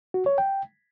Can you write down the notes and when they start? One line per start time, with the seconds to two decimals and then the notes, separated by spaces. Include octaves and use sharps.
0.14 F#4
0.26 C#5
0.38 G5